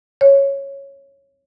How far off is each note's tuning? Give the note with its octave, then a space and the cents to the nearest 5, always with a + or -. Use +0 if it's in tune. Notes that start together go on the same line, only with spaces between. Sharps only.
C#5 -5